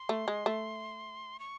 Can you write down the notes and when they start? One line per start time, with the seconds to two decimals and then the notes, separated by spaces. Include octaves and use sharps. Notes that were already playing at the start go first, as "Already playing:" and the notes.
Already playing: C6
0.09 A3
0.28 G#3
0.46 A3
1.40 C#6